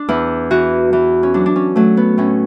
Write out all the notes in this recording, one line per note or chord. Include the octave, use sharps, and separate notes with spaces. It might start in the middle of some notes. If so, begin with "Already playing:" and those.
Already playing: D4
E2 E4
E3 F#4
E3
C#4
F#3 D4
D4
C#4
F#3 A3
B3
A2 C#4